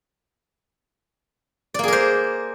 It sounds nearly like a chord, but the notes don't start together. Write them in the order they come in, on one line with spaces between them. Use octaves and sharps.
D5 A#3 G#4 A#4 C5